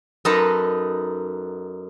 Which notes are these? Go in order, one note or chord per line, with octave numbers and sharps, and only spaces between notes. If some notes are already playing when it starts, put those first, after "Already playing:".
F#2 D#4 A4 B4 A#5 C6